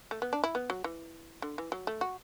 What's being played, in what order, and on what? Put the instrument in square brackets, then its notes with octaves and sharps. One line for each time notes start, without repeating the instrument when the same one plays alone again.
[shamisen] A3
B3
D4
E4
B3
F#3
E3
D3
E3
F#3
A3
F#4